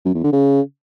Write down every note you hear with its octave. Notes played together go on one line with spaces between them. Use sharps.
F#2
E2
D3
C#3